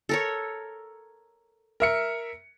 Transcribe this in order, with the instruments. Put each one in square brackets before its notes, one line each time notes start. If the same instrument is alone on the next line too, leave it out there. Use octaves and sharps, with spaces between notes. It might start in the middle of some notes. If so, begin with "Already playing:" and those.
[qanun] A4 A#4 C#5
[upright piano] A#4 E5 C#7